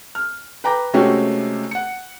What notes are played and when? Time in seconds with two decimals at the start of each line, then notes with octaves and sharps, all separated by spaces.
0.15 F6
0.64 B4 G5 A#5 D6 A#6
0.93 C3 G#3 A3 C#4 F#4 G4
1.71 F#5 C#7